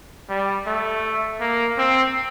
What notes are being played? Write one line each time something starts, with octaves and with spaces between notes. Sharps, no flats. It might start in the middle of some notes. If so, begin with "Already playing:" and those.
G3
A3
A#3
C4